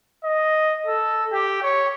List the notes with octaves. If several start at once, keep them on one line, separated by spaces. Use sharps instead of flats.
D#5
A4
G4
C#5